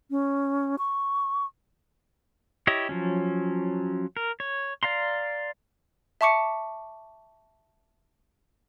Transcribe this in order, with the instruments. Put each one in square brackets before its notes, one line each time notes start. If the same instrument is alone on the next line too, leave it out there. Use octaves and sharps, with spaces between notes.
[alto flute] C#4
C#6
[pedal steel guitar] E4 G4 C#5 D#5
F3 F#3 C#4
A#4
C#5
D5 F5 A#5 C6
[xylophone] E5 A5 C#6 D6 C#7